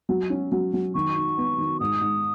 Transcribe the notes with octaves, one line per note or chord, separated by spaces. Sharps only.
F#3
C#4
F#3
F#3
D#3 C#6
D#4
B3
D#3
G#2 D#6
G#2